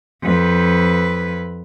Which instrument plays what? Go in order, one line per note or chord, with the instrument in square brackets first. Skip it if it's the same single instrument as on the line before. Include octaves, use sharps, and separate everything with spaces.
[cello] F2 B4